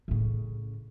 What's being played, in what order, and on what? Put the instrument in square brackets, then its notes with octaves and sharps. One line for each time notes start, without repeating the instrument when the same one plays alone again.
[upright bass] A2 C#3